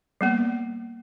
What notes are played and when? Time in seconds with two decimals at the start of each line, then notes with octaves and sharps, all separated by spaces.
0.21 G3 A#3 B3